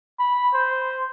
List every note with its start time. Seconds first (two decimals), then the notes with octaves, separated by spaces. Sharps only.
0.19 B5
0.54 C5